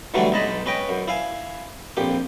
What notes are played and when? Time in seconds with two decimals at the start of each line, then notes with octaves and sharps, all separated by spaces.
0.14 D3 E3 F#3 G3 A3 D4
0.32 B1 G#3 D#5 A5 B5
0.66 C#4 B4 D#5 G5
0.89 F#2
1.08 E4 F5 G#5
1.97 A#1 F2 G4